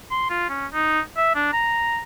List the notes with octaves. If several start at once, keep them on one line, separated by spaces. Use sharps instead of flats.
C6
F4
C#4
D#4
E5
D4
A#5